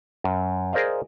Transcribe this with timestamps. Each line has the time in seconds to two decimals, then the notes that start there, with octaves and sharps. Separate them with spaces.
0.24 F#2
0.73 G#4 A#4 C5 D5 D#5 F5